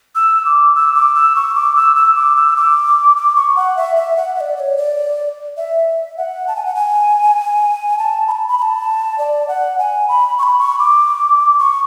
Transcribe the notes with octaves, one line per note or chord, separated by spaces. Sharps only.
E6
D6
E6
D6
E6
C#6
D6
E6
E6
D6
E6
D6
D6
C#6
F#5
E5
E5
F#5
E5
D5
D5
C#5
D5
E5
F#5
A5
G#5
F#5
G#5
A5
B5
A5
B5
B5
A5
D5
F#5
G#5
B5
C#6
B5
C#6
D6
C#6